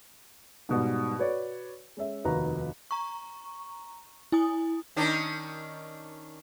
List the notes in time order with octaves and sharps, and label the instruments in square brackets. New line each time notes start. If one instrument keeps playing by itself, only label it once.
[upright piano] G#2 B2 G3
F#4 B4 C#5 D5
G#3 C#4 E5
F1 D#2 F#4 B4 A#5
[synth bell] A#5 C#6
E4 G#5 D#6
[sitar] D#3 C#4 D4